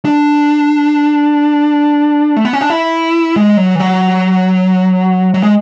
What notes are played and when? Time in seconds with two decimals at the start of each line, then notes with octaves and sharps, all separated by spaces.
0.05 D4
2.36 A3
2.45 B3
2.53 C#4
2.61 D4
2.70 E4
3.36 G#3
3.57 F#3
3.75 E3
3.80 F#3
5.34 F#3
5.43 G#3